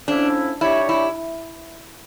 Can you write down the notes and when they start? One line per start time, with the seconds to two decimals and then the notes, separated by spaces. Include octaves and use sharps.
0.07 A2 F3 C#4 D4 E4
0.61 G3 D4 E4 G4 C#5
0.89 E4